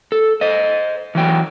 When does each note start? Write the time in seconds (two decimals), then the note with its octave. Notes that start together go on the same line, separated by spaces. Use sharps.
0.12 A4
0.41 C5 D#5
1.15 E3 F#3 G5